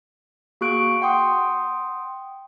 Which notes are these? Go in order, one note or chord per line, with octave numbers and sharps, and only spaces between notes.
A#3 F#4 G#4 C#6 F#6 D7
F#5 G5 C6 D#6